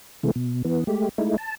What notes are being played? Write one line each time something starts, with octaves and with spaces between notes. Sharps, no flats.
C3 E3 G#3 A3
B2
E3 B3
G#3 A3 G4
G#3 A3 D#4 E4
A5